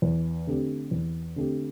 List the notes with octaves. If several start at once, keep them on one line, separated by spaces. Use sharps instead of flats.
E2
D3 A3 C4 G4
E2
D3 A3 C4 G4